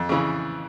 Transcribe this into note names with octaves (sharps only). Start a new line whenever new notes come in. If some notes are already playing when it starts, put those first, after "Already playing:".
Already playing: F2
C#3 E3